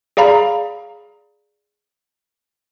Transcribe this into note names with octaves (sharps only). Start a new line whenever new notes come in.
G#4 D5 F5 A#5 B5